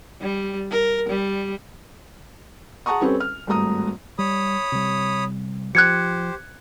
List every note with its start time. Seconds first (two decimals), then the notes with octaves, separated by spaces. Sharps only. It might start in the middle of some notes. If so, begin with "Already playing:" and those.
0.21 G3
0.71 A#4
1.09 G3
2.86 G#4 F#5 A5 A#5 C#6 D#6
3.01 G3 C4 C#4 A4 B4
3.20 F6
3.47 G#1 G2 A3 A#5 D#6
4.19 G3 C#5 B5 D#6
4.72 C3 G3
5.75 F3 G4 C5 F#6 G#6 C#7